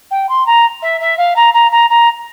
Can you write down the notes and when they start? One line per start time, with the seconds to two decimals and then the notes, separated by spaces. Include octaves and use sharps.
0.11 G5
0.29 C6
0.46 A#5
0.82 E5
1.01 E5
1.17 F5
1.36 A#5
1.53 A#5
1.71 A#5
1.90 A#5